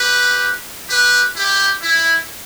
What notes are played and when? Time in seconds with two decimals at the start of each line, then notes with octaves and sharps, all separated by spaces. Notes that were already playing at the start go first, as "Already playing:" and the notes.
Already playing: G4 B4
0.90 G4 B4
1.36 E4 G4
1.82 E4